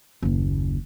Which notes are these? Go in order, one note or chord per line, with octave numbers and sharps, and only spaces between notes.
F#1 D#2